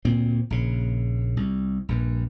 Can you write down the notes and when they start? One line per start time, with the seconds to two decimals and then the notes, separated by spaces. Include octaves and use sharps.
0.05 D2 A#2 C4
0.50 A#1 C#3
1.37 C2
1.89 A#1 G2